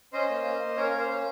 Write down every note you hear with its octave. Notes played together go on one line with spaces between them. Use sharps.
C#4 C5 D#5
A#3
A#3
A#3
C#4 A#4 C#5
A#3
C5
C#4